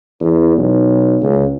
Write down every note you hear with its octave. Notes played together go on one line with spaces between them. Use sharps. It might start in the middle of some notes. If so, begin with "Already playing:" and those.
E2
B1
C#2